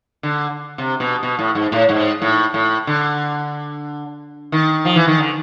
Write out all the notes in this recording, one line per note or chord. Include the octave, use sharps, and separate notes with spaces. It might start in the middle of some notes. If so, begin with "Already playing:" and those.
D3
C3
B2
B2
A2
G#2
A2
G#2
A2
A2
D3
D#3
F3
E3
D#3
D3